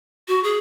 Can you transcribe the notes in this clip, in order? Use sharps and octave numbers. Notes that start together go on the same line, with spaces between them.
F#4
G#4